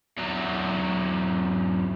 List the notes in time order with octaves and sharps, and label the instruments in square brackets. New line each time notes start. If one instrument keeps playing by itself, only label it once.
[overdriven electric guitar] E2 F#3